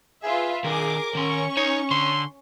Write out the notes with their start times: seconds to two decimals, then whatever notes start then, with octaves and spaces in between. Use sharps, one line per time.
0.23 F4 G#4 B4 E5
0.64 D#3 D4 G#4 A#4 D6
1.15 D#3 C#4 C6 C#6
1.57 D#4 C#5
1.91 D3 C6